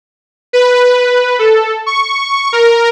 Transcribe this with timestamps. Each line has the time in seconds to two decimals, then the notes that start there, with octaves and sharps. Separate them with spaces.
0.53 B4
1.39 A4
1.86 C#6
2.53 A#4